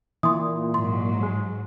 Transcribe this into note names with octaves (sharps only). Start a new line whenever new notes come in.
A#2 E3 C6 D#6
G#2 F#3 C6
G#3